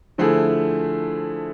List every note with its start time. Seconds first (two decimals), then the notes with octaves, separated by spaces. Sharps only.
0.18 D3 F3 A3 E4 G#4